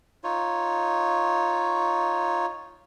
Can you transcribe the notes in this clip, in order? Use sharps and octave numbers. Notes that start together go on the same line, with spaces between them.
D#4 F4 C#5